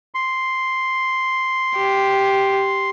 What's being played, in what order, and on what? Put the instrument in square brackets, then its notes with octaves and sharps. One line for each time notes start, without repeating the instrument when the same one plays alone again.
[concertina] C6
[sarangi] G4